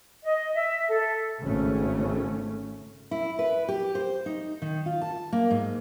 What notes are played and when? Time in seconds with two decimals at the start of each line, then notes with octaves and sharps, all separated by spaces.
0.23 D#5
0.54 E5
0.89 A4
1.42 G#1 C#3 A3 C#4
3.11 E4
3.39 B4
3.68 G4
3.95 C5
4.26 D#4
4.62 D#3
4.86 F4
5.02 A5
5.32 A#3
5.51 G#2